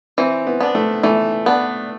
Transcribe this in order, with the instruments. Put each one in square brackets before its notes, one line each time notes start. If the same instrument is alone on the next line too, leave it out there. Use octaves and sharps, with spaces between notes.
[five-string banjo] E3 [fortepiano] C4
[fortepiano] B3
[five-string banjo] B3 D4
[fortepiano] A3
[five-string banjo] E3 [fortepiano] A3
[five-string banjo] B3 D4